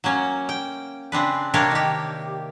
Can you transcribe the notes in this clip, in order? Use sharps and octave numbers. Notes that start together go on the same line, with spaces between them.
F#3 A#3 C#4
G5
C#3 C4 D4 B4
C3 A#3 D4 G4 A#4 C#5
D#3 G4